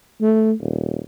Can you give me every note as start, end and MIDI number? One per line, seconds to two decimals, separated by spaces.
0.21 0.53 57
0.60 0.99 27